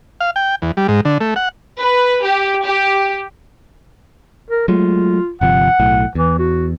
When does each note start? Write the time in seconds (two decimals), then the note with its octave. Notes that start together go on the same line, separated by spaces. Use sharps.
0.21 F5
0.36 G5
0.62 E2
0.77 G3
0.88 G#2
1.05 D3
1.21 A3
1.36 F#5
1.79 B4
2.25 G4
2.64 G4
4.50 A#4
4.68 F#3 G#3 A3 F4
5.41 G1 C3 F3 F#5
5.80 B1 A2
6.15 E2 E3
6.39 F#4